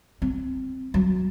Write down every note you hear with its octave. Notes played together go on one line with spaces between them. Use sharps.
C4
F#3